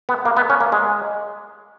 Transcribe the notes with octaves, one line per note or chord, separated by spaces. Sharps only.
B3
A#3
B3
C#4
A#3
G#3